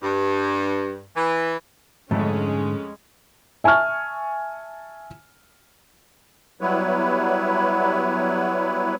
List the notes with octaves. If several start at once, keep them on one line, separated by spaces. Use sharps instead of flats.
G2
E3
F2 G#2 D3 G#3 A3 C#4
E5 G#5 A5 C#6 F6
F#3 G3 B3 E4 B4 C#5